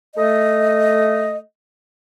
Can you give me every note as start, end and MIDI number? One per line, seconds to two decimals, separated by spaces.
0.16 1.38 57
0.16 1.38 75